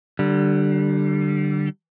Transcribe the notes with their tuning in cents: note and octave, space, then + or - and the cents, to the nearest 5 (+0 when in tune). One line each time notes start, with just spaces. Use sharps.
D3 +15 G3 -20